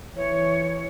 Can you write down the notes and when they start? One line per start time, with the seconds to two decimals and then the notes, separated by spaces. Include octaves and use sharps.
0.16 E3 C#5